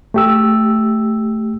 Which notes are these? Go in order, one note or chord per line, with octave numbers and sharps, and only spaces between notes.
A3 G4 E6